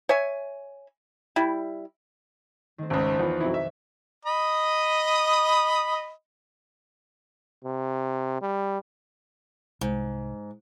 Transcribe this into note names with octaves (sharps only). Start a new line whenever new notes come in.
C#5 E5 G#5
G3 E4
D#3 A3 C4
G#1 C#2
E2 F3 A#4 C5 C#5
B1 F2 F#3 C4 E4
E5
D#5 B5 D#6
C3
G3
C2 G#2